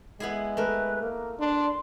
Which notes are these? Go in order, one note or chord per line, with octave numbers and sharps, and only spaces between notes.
G#3 B3 E4 G#4
A3 A#4 B4
A#3
D4 C6